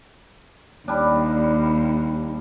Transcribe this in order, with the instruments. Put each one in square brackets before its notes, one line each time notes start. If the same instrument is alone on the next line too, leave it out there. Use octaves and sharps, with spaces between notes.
[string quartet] D#2 [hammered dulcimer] G3 D4